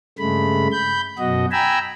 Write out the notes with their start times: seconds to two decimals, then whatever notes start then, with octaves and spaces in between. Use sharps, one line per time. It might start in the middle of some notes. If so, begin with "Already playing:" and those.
0.19 G2 C#3 G#3 A3 B5
0.72 B5 G6
1.18 F#2 B2 F#4 D#5
1.52 G5 G#5 A#5 B5 E6